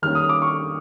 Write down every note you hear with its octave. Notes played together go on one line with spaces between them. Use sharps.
D#3 G3 A#3 C#4 F6
D#6
D6
C#6